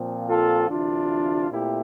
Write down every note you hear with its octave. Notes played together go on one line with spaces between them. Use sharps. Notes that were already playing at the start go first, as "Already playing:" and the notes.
Already playing: A#2 F3 C4
F4 A4
D2 C3 E3 D4 F4
A#2 A3 C4 E4 G4